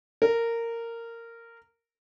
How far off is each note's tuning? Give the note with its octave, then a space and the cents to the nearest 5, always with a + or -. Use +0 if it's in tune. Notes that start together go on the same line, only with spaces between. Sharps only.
A#4 -15